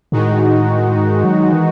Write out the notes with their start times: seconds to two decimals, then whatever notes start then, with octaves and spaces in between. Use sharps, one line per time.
0.12 A2 D#3 G#3 D#4 F#4
0.97 G#2
1.24 F#3
1.53 E3